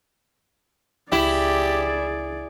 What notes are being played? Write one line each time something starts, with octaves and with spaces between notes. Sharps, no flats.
C#2 E4 G4 G#4 D5